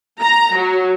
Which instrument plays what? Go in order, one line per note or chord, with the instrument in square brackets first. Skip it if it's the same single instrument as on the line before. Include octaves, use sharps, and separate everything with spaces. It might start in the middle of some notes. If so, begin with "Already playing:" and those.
[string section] A#5
F#3